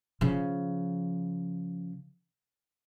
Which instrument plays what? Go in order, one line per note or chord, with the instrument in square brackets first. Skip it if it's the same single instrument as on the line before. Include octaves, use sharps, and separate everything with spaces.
[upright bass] C#3 F3